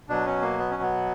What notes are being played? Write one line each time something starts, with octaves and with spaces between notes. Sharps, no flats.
B2 F#3 D4
C#4
A#3
B3
C#4
B3